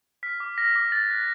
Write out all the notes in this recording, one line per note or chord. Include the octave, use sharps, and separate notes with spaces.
F6 B6
D6
F6 A#6
D6
F#6 A6
F#6